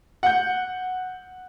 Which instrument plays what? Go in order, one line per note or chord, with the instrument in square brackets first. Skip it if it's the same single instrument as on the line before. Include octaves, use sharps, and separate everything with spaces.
[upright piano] F#5 G6